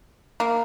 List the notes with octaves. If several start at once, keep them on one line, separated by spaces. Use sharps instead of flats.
A#3